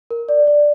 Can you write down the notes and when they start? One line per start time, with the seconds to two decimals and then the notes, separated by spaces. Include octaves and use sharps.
0.11 A#4
0.29 D5
0.47 D5